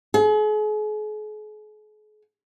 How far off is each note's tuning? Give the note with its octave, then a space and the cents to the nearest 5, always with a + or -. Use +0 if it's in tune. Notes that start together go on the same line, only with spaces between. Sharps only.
G#4 +40